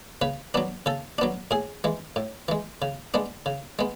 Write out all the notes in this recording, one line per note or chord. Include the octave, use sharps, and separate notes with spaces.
C#3 B4
F#3 B3 D4
C#3 A4
F#3 B3 D4
A2 G#4
E3 G#3
A2
E3 G#3
C#3
G#3 B3 D4
C#3
G#3 B3